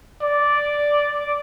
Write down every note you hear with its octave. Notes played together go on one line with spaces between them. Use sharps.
D5